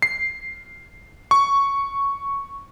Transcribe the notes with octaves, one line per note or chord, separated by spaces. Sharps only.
C7
C#6